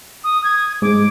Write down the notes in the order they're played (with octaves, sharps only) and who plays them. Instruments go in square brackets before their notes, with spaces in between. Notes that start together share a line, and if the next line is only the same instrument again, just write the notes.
[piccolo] D#6
G#6
[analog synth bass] G#2 [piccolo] D6